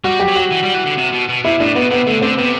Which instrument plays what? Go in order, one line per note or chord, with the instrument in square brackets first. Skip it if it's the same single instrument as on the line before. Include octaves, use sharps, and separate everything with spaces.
[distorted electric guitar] G3 [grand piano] F#4
[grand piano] G4
[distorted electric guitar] F#3
[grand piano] F#4
[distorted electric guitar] E3
G3
E3
D3
C3
B2
B2
[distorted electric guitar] C3 [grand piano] E4
[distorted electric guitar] A2 [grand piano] D4
[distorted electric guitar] B2 [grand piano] B3
[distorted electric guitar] C3 [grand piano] B3
[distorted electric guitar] D3 [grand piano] A3
[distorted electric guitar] D3 [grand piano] C4
[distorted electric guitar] C3 [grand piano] B3